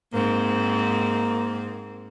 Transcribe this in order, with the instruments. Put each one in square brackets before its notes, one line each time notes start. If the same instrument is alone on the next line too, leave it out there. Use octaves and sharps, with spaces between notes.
[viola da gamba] G#2 C4 [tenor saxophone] A#3